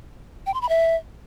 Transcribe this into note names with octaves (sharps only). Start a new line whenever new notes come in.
G5
C6
B5
E5